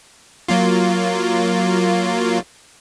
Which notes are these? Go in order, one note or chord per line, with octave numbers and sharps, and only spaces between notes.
F#3 A#3 F4